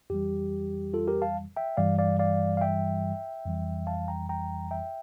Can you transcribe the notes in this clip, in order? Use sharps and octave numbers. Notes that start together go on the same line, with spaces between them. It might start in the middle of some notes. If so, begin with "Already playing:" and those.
F2 E3 G3 G4
F4 A4
G4 A#4
F5 A5
E5 G5
G2 E3 G3 D5 F5
D5 F5
D5 F5
F5
E5 G5
F2 E3 G3
F5 A5
G5 A#5
G5 A#5
E5 G5